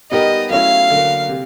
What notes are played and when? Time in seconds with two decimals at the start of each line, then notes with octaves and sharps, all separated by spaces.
0.11 G3 B3 D#4 G4 A#4 D#5
0.50 F#3 A3 C#4 E4 F5
0.90 D3 F#3 A#3
1.29 C3